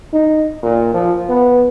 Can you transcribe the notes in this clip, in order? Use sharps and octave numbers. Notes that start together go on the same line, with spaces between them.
D#4
A#2
F3
B3